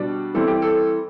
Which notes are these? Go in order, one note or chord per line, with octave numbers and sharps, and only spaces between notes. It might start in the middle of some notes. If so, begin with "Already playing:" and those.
Already playing: B2 G3 D4
E3 G3 C4 A4
G4
A4